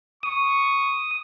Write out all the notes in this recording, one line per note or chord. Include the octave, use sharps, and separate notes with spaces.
C#6 D#6